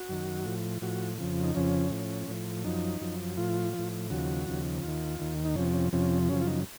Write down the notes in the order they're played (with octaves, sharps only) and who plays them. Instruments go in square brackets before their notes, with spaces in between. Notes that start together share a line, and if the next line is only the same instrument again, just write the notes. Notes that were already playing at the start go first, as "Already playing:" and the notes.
Already playing: [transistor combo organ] F#4
F#2 D#3
A2 F3
A2 F3 F#4
F2 C#3 F3
D#4
F2 C#3 F3 C#4
A2 F3
A2 F3
F#2 F3 D#4
F#2 F3
A2 F3 F4
F3
A2
D#2 C#3 F3 F#4
D#2 C#3 F3
D#2 D#3 F4
D#2 D#3
D#4
F2 C3 F3 C#4
C#4
F2 C3 F3 C#4
F#2 C#3 F3 C#4
F4
D#4